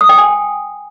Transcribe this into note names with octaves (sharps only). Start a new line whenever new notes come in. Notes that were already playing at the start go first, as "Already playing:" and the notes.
D#6
G5
G#5